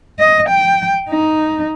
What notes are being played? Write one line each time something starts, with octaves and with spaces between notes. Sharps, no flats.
D#5
G5
D#4